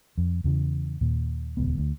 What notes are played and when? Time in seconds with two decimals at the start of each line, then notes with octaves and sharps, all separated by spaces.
0.18 F2
0.44 E2 C#3 E3
1.01 D#2 A#2
1.57 D#1 C#2 B3
1.78 D2